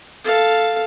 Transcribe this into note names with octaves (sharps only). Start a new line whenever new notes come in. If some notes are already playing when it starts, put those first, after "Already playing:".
A4 F5